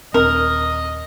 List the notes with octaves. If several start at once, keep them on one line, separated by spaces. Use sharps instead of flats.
D#1 C4 A#4 D#5